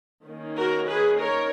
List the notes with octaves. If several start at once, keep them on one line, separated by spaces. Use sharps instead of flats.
D#3 A#3 C#4
F#4 A#4
G#4 B4
A#4 C#5